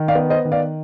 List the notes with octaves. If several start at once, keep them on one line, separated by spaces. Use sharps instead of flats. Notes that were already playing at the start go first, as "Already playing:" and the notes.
Already playing: D#3
D5 F5
B3
C5 D#5
D#3
D5 F5